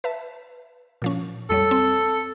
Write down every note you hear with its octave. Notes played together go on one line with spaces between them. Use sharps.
B4 E5 A5
A#2 F3 C#4
F2 G3 A4 C#5
C4